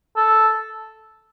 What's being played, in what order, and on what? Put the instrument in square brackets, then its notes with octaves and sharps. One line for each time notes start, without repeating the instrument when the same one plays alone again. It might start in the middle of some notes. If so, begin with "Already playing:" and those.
[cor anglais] A4